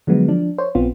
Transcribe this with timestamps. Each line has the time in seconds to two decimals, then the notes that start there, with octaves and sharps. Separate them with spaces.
0.07 D3 F3 F#3 G#3 B3
0.28 F3 D4
0.58 C5 C#5
0.75 A#1 B3 C4 F4